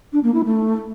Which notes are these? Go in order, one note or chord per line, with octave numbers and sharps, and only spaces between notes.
D4
A#3
E4
A3